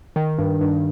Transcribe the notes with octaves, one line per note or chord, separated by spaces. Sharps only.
D#3
G2
G2